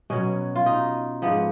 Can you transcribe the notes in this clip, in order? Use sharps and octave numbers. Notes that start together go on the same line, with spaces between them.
B2 F#3 C#4
F4
D#4
G#2 F3 B3